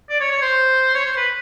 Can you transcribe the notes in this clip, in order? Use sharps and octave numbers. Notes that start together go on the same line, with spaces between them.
D5
C#5
C#5
C5
C#5
C5
B4